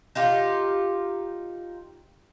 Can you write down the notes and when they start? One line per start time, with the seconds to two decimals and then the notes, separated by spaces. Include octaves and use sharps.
0.15 D#4 F4 G4